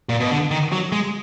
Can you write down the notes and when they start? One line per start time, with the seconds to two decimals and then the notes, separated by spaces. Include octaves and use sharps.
0.09 A#2
0.20 B2
0.31 D3
0.51 D#3
0.72 F#3
0.92 G#3